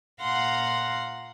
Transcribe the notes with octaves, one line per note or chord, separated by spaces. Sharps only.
A#2 F5 F#5 A#5 C6